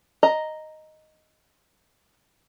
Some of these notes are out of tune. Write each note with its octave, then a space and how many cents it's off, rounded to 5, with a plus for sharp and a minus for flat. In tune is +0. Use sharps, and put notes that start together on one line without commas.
D#5 +0 A#5 +0